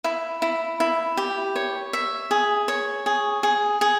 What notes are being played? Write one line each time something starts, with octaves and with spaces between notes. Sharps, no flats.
E4
E4
E4
G4
C#5
E5
G#4
C#5
G#4
G#4
G#4